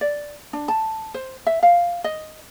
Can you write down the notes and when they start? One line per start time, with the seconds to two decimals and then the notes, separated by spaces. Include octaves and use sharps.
0.01 D5
0.53 D4
0.68 A5
1.14 C5
1.46 E5
1.63 F5
2.04 D#5